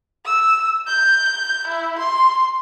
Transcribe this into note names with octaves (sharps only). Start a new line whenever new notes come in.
E6
G6
E4
C6